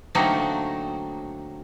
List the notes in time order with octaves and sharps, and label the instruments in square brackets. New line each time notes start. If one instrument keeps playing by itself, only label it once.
[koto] D3 F#3 A3 A#3 C4 D#4